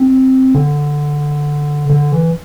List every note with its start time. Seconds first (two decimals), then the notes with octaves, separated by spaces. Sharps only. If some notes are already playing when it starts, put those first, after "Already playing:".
Already playing: C4
0.55 D3
1.90 D3
2.12 E3